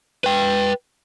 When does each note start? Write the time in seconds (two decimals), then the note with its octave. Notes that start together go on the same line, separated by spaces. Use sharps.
0.24 B4 G5